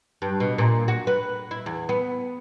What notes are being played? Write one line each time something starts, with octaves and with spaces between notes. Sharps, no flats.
G2
B2
A#2
F#4
B4
E4
E2
B3